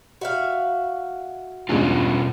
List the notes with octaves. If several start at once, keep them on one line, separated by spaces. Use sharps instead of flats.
F#4 E5 F5
E2 G2 B2 G#3 C#4 F4